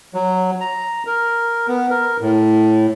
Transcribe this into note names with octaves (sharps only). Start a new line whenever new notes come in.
F#3
A#5
A#4
B3
A#4
A2